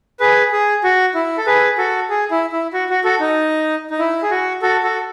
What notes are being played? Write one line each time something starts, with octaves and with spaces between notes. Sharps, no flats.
G#4 B4
G#4
F#4
E4
A4
G#4 B4
F#4 A4
G#4
E4
E4
F#4
F#4
F#4 A4
D#4
D#4
E4
G#4
F#4
F#4 A4
F#4 A4